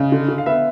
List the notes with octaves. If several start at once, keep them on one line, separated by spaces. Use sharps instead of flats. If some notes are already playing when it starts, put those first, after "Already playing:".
Already playing: C#3 D#5
D3
D3
F5
B3 E5